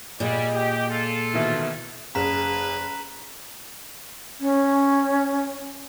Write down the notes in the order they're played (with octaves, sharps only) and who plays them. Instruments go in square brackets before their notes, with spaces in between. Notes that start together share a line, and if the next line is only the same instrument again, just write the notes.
[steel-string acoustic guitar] A#2 G#3 [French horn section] G3 [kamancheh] D#5
[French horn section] G4
F4 A4
[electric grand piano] B2 D#3 E3 [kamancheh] E5
[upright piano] F#1 [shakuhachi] G#4 [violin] B4 [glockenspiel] A#5 B6 E7
[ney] C#4